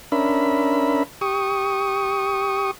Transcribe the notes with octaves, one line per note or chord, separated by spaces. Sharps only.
C#4 D4 A#4 E5 B5
G4 C#6 D#6